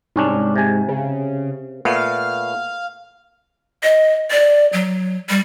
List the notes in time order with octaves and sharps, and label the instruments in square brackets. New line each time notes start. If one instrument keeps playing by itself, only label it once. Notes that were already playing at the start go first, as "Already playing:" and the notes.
[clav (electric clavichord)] C2 C#4 D4 [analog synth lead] G#2
[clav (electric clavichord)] C3 G#5
[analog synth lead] C#3
[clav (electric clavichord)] A#2 A3 B3 [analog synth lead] F5
[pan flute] D#5
D5
F#3
G3